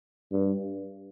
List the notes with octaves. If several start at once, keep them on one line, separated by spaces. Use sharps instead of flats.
G2